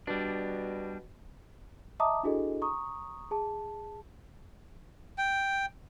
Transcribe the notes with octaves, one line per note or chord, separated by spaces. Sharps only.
B2 G3 D4
D#5 E5 A5 A#5 D6 D#6
D4 E4 F#4 G#4 A4 D#5
A#5 C#6 D#6
G#4 A5
G5